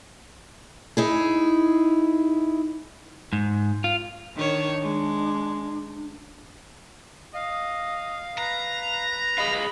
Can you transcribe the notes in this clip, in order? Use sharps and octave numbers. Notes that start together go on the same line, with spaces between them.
D#4 E4 G#4
G#2
F4
D#3 D4 C#5
G#3
D#5 F5
B4 A#5
G#4 D#5 F5 B5